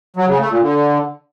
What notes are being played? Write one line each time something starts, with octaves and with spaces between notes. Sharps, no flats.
F#3
C#3
A3
A#2
D3